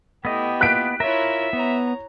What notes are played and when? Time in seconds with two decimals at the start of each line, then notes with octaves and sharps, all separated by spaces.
0.25 A3 B3 E4 G4 D#5
0.61 F4 F#6 B6 D7
1.00 E4 F4 A#4 C#5 E5
1.53 B3 C#5 A#5